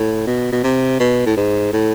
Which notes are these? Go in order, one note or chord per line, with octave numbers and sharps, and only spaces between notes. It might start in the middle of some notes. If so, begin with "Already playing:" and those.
Already playing: A2
B2
B2
C3
B2
A2
G#2
A2